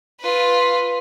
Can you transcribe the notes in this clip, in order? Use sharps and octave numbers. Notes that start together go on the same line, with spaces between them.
F4 B4